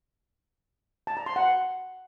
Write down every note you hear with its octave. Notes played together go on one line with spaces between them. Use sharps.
A5
A#5
C6
F#5